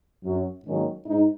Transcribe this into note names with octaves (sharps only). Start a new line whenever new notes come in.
F#2 F#3 C#4
G#2 D#3 F#3 A#3 C#4
G#2 D#4